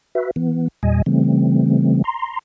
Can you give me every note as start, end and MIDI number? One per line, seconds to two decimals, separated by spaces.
0.15 0.31 66
0.15 0.31 71
0.15 0.31 76
0.36 0.68 52
0.36 0.68 59
0.83 1.02 40
0.83 1.02 46
0.83 1.02 55
0.83 1.02 75
0.83 1.02 80
1.06 2.02 49
1.06 2.02 52
1.06 2.02 55
1.06 2.02 57
1.06 2.02 60
2.04 2.39 82
2.04 2.39 84